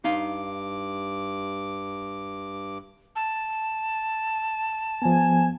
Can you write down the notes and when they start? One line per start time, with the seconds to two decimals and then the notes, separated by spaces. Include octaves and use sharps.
0.05 G2 D#4 F5 D6
3.16 A5
5.02 F3 B3 G#5